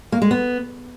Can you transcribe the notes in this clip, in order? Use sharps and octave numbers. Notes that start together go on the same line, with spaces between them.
A#3
G#3
B3